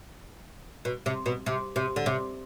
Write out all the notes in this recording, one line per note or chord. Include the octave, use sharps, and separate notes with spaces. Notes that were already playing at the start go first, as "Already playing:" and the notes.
B2
C3
B2
C3
C3
D3
C3